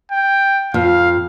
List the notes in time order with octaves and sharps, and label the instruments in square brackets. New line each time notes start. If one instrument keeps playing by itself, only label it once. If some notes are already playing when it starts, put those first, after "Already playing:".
[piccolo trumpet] G5
[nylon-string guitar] F2 [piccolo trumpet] F5